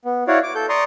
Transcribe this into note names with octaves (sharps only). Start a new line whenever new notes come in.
B3
E4 F#4 C#5 D5 F5 F#5
D6
A4 G6
D5 A#5 C6 C#6 D#6